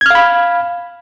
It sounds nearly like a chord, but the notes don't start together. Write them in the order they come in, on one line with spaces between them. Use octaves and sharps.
G#6 F6 F5 B5